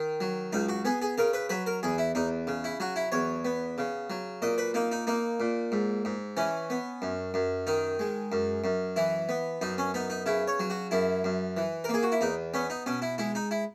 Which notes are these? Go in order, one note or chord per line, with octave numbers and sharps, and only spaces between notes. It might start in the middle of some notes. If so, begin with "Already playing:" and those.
Already playing: D#3
F#3
C#2 D#4
F#4
B3 G#4
G#4
C#3 A#4
B4
F#3 B4
A#4
E2 G#4
E4
E2 D#4
C#3
E4
F#3 F#4
E4
E2 C#5
B3
C#3
F#3
A#2 D#5
B4
A#3 D#4
D#4
A#3 D#4
A#2
G#2
G#2
E3 C#4
B3
F#2
F#2
D#3 D#4
G#3
F#2
F#2
E3 E4
B3
F#2 D#4
C#4
B3 D#4
D#4
C#3 E4
C#5
F#3
F#4
F#2 E4
F#2
E3
A#4
A#3 G#4
F#4
E4
E2 D#4
B3 C#4
D#4
B2 C#4
E4
G#3 E4
D#4
E4